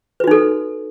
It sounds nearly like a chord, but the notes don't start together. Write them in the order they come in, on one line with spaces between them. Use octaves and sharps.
B4 F#4 D#4 A4